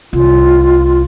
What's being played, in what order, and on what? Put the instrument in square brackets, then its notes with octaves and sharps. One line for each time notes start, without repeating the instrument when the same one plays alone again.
[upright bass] C2 [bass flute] F4